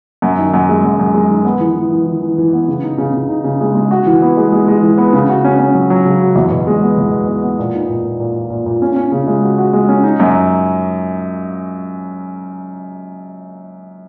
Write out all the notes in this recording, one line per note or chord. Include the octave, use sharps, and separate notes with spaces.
F#2
D#3
F#2
G#3
F#2
F#2
G#3
D#3
B3
E3
E3
E3
E3
E3
E3
B3
C#3
D#4
C#3
C#3
D#4
C#3
G#3
G#3
F#4
E3
B3
G#3
G#3
G#3
E3
B3
C#3
F#4
C#4
C#4
F#3
F#3
C#3
F#4
E2
B2
G#3
B3
E2
B2
B3
B3
A#2
D#4
A#2
A#2
A#2
A#2
A#2
A#2
C#4
C#4
C#3
G#3
F#4
F#4
G#3
C#4
D#4
F#2